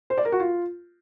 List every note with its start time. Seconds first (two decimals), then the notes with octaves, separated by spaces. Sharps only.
0.10 C5
0.18 D5
0.25 A#4
0.32 F#4
0.40 F4